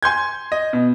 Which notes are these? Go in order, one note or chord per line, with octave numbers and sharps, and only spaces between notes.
G#5 C6 G6 G#6
D#5
B2